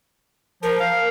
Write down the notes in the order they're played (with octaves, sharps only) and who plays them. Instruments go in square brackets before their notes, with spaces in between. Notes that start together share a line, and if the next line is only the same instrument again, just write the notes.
[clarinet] F3 [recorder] A#4
[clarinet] F5